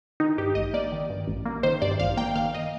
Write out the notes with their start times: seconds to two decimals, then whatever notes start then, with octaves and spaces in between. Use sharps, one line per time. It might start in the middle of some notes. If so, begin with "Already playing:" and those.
0.20 D#3 D#4
0.38 G2 G4
0.55 A1 D#5
0.74 A#3 D5
0.92 D#3
1.10 G2
1.28 A1
1.46 A#3
1.63 D#3 C5
1.82 G2 D5
2.00 A1 F5
2.17 A#3 G5
2.35 D#3 F5
2.54 D#5